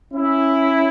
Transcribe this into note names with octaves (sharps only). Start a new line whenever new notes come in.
C#4 E4